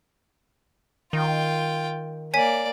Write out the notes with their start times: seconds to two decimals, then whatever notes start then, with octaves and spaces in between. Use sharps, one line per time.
1.13 D#3 F4 G5
2.34 A#3 C#5 D5 G#5 B6